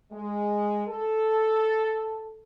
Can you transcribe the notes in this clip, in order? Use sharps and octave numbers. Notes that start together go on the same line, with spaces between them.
G#3
A4